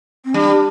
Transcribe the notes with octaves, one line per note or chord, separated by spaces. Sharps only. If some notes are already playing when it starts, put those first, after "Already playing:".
C4
G3 D4